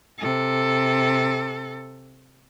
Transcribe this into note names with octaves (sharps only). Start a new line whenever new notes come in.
C3 A4